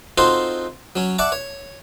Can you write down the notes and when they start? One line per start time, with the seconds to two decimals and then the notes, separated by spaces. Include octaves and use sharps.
0.18 C4 D#4 F4 F#4 A4 C5
0.96 F#3 C#4
1.19 D5 E5 F#5 A5 C#6 D6
1.32 C#5